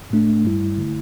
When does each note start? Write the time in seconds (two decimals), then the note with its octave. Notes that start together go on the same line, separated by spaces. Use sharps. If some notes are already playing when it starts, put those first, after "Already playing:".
0.10 A2 A3 D4
0.44 G2 G3 E4
0.77 D3 A3 E4